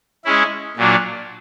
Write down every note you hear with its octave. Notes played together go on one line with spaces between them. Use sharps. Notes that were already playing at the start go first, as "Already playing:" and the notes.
G#3 C#4 E4
A#2 F#3 A#3 D4